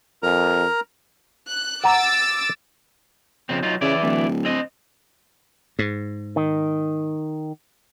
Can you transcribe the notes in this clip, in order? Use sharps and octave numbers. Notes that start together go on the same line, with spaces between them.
F2 A#4 A#5
F#6
F#5 A#5 D6 E6 A6
F2 C#3 C4
F#3 D#4 F4
C#3 E3 E4 D5
D1
C4 D#5
G#2
D#3